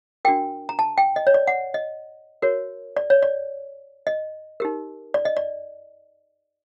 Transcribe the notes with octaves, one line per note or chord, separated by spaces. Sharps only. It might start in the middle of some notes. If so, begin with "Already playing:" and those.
D4 F#4 A#4 G5
A#5
A5
G5
D#5
C#5
D5
F#5
D#5
F#4 A#4 C#5
D5
C#5
D5
D#5
D#4 G4 A#4
D5
D#5
D5